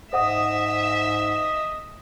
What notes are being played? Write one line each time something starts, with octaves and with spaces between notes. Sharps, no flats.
G#2 C5 D#5 E5 F#5 D#6